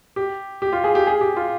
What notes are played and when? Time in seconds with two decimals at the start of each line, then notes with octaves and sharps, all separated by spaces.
0.16 G4
0.62 G4
0.73 F4
0.84 G#4
0.95 G4
1.07 G#4
1.21 G4
1.36 F4